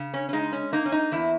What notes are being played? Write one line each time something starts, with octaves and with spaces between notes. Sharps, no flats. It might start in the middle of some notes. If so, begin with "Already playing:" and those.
Already playing: C#3
C#4
C#4
G#3 D#4
C#4
A#3 D#4
C#4
D#4
E2 E4